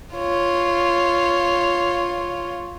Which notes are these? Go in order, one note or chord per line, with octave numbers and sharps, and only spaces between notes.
F4 C#5